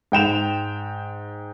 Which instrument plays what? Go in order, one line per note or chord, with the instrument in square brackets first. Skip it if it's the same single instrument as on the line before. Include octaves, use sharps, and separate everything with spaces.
[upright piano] G#2 G5 E7 F7